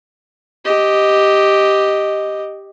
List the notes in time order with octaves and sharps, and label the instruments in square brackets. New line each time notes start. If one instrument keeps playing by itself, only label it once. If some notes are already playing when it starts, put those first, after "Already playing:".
[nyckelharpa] G4 D#5